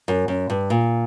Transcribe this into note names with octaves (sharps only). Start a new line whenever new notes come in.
F#2
F#2
G2
A#2